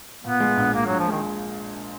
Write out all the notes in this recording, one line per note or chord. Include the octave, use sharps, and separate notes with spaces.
A#2 B3
G#3
A#1
A#2 A#3
A#1 F#3
F3
D#3 G#3